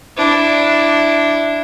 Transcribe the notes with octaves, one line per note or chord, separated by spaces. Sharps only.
D4 E4